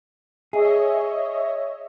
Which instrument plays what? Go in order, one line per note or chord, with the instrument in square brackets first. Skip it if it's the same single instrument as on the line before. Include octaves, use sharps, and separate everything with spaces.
[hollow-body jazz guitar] G#4 [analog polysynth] C#5 D#5 E5